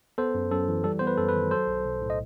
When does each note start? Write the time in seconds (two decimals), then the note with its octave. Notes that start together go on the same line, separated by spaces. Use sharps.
0.18 B3 A4 C5
0.35 F#2
0.51 F#2 A4
0.68 E3
0.84 G3 A4
0.99 B3 C5
1.07 B4
1.18 F#2 A4
1.28 B4
1.35 D#3
1.51 F#3 A4 C5
1.67 B1
1.85 B1
2.02 A2
2.10 D#5